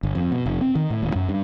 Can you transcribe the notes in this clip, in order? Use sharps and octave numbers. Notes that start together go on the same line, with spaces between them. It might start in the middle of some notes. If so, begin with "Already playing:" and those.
G1
F2
B2
F1
C4
D#3
A2
D#1
F#2
G2